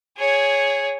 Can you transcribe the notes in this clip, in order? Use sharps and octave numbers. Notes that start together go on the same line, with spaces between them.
G#4 C#5